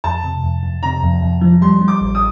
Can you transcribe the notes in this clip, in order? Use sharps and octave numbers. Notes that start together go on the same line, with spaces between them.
F2 A5
C3
F2
F2
C3 A#5
F2
F2
F3
G3 C6
G3
D6
A1
D#6